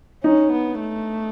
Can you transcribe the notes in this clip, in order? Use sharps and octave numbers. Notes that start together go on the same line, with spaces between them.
C#4 D#4
B3
A3